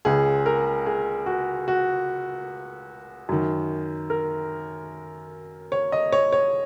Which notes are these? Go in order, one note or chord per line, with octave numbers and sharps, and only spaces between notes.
C#2 C#3 G#4
A#4
G#4
F#4
F#4
F#2 D#3
A#4
C#5
D#5
C#5
C#5